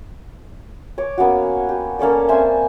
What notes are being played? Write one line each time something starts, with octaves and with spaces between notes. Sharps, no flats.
C#5 D6
A#3 B3 C#4 F#4
G4
A#3 C#4 A4 D5
C4 C5 E5 G#5